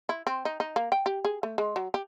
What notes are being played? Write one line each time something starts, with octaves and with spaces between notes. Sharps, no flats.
E4
C4
D#4
D#4
A#3
G5
G4
G#4
A3
G#3
F#3
G4